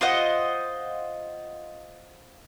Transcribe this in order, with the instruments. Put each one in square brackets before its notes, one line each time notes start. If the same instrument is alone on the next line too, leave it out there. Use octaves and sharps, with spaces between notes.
[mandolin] F4 C5 D#5 F#5